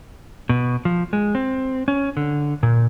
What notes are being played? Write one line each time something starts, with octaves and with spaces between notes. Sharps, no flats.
B2
F3
G#3
C4
C#4
D3
A#2